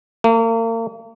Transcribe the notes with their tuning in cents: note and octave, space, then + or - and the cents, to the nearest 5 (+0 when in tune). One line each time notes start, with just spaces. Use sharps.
A#3 -40